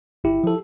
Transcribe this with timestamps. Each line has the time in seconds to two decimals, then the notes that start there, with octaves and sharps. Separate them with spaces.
0.24 G1 E4 G4
0.44 F3 A4